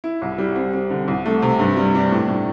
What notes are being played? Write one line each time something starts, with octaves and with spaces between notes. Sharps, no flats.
E4
C2
G3
C4
C4
D3
C2
A3
C3
G2
G3
D4
A2
A2